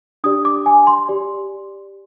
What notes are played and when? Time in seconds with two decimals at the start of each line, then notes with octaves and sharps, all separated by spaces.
0.24 D4 G4 D5 D#6
0.45 D6
0.66 G#5
0.87 C6
1.09 G4 D5